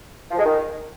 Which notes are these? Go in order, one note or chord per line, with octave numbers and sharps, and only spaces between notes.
F3
G#3
D#3